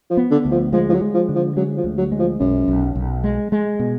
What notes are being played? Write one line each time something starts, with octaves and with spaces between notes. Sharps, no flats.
F3
B3
D3
D2
F3
F3 G#3
F3
F#3
G#3
F3
D3
F3
F#3 G#3
F3
D2
F#3
G#3
F3
B1 F#2
B1
B1
G#3
G#3
B2